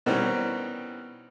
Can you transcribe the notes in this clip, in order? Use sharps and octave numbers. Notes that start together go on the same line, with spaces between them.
B2 D#3 E3 G3 C4 C#4